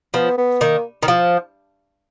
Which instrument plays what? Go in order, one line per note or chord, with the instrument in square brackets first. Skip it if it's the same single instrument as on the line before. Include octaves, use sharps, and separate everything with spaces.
[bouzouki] F3 [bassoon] B3
[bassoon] B3
[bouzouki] D#3 [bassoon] A#3
[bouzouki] D#3
F3